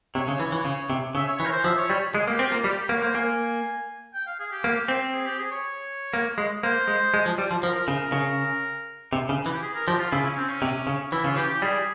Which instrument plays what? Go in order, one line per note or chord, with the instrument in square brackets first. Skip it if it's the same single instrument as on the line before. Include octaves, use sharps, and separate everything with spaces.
[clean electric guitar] C3 [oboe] C#5
[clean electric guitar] C#3
E3
E3
C#3
C3
[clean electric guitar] C#3 [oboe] E5
[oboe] C#5
[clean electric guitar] E3 [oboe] C#5
[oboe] A#4
C5
[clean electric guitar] F3 [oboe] E5
[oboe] C#5
[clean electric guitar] G3 [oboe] C#5
[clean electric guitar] G#3 [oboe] G#4
[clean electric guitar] A#3
[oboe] G4
[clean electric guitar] C4
[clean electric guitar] A#3 [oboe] F4
[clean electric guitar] G3 [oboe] G4
[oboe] G4
[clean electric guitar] A#3
[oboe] C#5
[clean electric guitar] A#3 [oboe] C5
[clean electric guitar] A#3 [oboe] G#5
[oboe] G5
F5
G#4
G4
[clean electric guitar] A#3
C4
[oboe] G#4
G4
G#4
C#5
[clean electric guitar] A#3
G#3
[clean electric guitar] A#3 [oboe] C5
[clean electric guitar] G#3
G#3
F3
G3
F3
[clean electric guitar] F3 [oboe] A#4
[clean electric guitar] C#3
C#3
C3
C#3
E3
[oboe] G4
G#4
A#4
[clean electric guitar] F3 [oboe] G4
[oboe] F4
[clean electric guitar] C#3 [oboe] E4
[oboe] C#4
C4
C#4
[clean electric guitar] C3
C#3
[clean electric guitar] E3 [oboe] E4
[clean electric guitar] C#3 [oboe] F4
[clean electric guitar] E3 [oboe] G4
[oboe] G4
[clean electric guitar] G3 [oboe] G#4